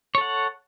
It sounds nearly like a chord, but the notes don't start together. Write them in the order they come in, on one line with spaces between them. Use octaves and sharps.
C#5 A4 F#5